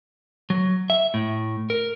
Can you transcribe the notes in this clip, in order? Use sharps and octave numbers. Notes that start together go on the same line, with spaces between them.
F#3
E5
A2
A#4